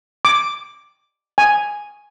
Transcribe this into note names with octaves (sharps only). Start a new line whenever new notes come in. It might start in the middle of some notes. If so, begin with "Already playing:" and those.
D6
G#5